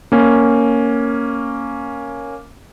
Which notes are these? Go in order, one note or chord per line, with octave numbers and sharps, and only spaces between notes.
A#3 C#4